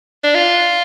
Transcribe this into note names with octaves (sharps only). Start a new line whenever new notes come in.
D4
F4